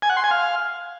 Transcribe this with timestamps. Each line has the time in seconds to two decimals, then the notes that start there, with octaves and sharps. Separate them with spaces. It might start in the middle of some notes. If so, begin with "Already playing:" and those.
0.02 G#5
0.10 F#5
0.17 C6
0.24 G#5
0.31 F5